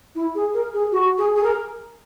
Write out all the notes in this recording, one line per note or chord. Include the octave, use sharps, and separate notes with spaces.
E4
G#4
A#4
G#4
F#4
G#4
G#4
A#4